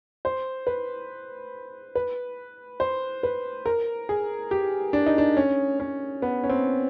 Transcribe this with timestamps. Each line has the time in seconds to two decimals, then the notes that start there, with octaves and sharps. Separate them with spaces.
0.25 C5
0.67 B4
1.95 B4
2.80 C5
3.23 B4
3.66 A#4
4.09 G#4
4.51 G4
4.93 D4
5.06 D#4
5.18 D4
5.37 C#4
5.80 C#4
6.22 B3
6.44 C#4
6.50 C4